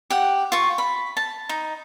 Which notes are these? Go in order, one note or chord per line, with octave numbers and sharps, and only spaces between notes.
G4 F#5
F4 C#6
B5
A5
D#4